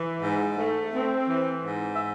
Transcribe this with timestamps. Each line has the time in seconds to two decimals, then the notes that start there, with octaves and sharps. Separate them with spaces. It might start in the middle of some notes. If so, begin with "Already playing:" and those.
Already playing: E3
0.21 G#2
0.57 A3
0.93 C4
1.28 E3
1.64 G#2
1.94 E5